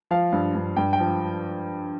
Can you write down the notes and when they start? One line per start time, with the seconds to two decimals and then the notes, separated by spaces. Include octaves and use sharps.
0.11 F3 F5
0.32 G2
0.55 G2
0.77 G2 G5
0.93 G5
1.00 F3